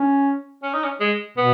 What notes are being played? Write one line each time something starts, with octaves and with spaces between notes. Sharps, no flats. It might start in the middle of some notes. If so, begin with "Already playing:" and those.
Already playing: C#4
C#4
D#4
C#4
G#3
B2 B3